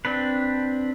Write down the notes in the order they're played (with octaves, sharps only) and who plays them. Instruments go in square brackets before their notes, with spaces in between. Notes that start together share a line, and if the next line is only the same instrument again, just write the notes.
[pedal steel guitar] C4 D4 B4